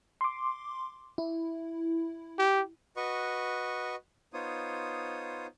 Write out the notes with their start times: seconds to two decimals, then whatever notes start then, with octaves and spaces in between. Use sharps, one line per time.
0.21 C6 D6
1.18 E4
2.39 G4
2.96 F#4 B4 D#5 C#6
4.33 B3 D#4 F4 C5 C#5 D#6